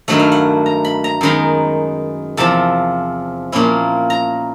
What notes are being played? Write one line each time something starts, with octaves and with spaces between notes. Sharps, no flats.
G2 D#3 F#3 A3 F#5
F5
F#5
A#5
B5
A#5
F#2 D#3 G#3 B3 A#5
E2 C3 F3 A5
A#2 F3 A#3 C#4 E4
A#5